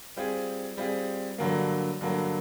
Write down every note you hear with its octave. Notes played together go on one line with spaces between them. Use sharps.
G3 C4 F4 G#4
G3 C4 F4 G#4
G2 D3 F#3 A#3
G2 D3 F#3 A#3